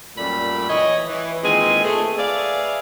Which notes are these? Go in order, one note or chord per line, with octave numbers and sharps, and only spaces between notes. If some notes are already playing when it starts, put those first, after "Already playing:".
F#2 A#2 G3 A3 D5 B5
E3 C#5 D#5
E3
A#2 D#3 G#3 C4 B4 G#5
A3 G#4
G#4 B4 D5 E5 F5